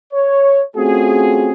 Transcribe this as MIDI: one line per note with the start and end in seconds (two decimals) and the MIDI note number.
0.13 0.63 73
0.76 1.52 57
0.76 1.52 60
0.76 1.52 61
0.76 1.52 65
0.76 1.52 66
0.76 1.52 68